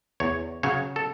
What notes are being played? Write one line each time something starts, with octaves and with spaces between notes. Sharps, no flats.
E2 C#5
C#3 F#3 C#5
A4